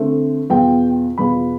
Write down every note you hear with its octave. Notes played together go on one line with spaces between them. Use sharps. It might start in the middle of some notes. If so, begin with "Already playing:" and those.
Already playing: D3 A3 C4
E2 B2 B3 F4 G5
E2 B2 B3 F4 B5